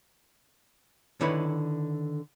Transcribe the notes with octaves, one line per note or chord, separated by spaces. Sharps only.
D3 D#3 E4 B4 C#5 B5